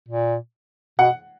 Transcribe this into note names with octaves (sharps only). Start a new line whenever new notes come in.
A#2
B2 F#5